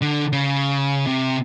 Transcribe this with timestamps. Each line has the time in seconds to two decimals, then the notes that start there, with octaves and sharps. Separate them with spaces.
0.01 D3
0.33 C#3
1.07 C3